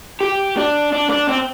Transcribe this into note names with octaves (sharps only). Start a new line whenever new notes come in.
G4
D4
D4
D4
C4